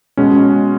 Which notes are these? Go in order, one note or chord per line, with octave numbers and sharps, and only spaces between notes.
B2 G#3 C#4